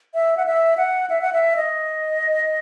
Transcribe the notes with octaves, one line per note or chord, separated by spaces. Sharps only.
E5
F#5
E5
F#5
E5
F#5
E5
D#5